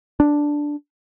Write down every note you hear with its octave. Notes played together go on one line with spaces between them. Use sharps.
D4